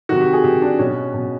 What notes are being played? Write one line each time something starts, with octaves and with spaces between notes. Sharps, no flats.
C3 D#3 F#4
G4
G#4
C3 D#3 G4
D4
B2 C#4
B2